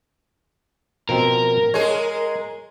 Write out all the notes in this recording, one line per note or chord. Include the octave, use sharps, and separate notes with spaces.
B2 F3 C4 A#4
G#3 G#4 C#5